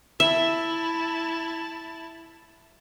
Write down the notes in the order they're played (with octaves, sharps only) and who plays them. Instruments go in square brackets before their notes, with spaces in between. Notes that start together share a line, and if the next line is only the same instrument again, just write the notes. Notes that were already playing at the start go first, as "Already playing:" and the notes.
[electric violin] E4 A5 [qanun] E5